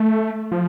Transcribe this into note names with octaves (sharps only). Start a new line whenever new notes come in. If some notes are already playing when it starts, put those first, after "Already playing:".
Already playing: A3
F3